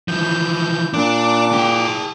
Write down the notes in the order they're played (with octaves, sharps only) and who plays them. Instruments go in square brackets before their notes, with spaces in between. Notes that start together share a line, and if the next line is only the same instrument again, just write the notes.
[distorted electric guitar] E3 F3 [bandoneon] G6
[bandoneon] A#2 D6 [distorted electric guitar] D4
[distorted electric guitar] G#4 G5